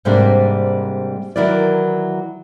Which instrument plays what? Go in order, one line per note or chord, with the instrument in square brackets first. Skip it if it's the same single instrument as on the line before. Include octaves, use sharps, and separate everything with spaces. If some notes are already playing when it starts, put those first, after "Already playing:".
[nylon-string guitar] G#2 C3 G3 A#3 D4
D#3 E3 F#3 E4 A#4 D5